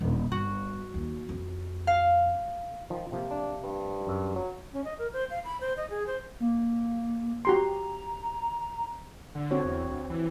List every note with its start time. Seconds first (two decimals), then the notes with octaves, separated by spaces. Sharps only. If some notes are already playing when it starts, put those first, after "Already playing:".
0.01 D#1 D3
0.32 G1 F#4
0.94 D#2
1.29 F2
1.87 F5
2.90 D#3 F3
3.12 C3 F3 A#3
3.31 D4
3.64 G2
4.07 F#2
4.36 F#3
4.73 C#4
4.84 D#5
4.99 A#4
5.13 C5
5.30 F5
5.45 B5
5.61 C5
5.77 D#5
5.90 G#4
6.07 C5
6.40 A#3
7.45 F#4 G4 A#5 C6
9.35 D3
9.51 C4 F#4 C#5
9.65 E2
9.89 D2
10.10 E3